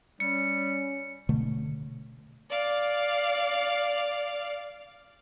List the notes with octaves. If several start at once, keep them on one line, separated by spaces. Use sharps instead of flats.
G3 C#4 C#7
B2 D3 A3
D5 F5